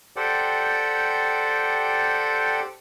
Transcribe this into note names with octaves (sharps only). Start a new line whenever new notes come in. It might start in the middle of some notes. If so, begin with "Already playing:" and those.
G4 A4 C5 D5 F#5 G5